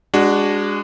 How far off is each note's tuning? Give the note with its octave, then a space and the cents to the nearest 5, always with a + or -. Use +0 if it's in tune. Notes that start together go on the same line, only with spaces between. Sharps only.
G#3 -20 D4 +0 F#4 +10